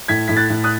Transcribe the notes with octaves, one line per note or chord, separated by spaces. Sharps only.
A2 G#6 B6
A2 B6
F#6 A6
A2
D#6 F#6